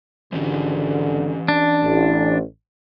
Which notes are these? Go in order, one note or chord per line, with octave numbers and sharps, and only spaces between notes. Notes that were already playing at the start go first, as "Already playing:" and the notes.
G#1 D3 E3 C#4 G4
D4
A1